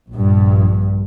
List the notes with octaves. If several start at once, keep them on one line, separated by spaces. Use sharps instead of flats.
A#1 G2